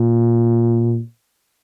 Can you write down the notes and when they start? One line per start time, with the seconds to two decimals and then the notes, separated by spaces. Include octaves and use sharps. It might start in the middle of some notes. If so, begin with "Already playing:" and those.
Already playing: A#2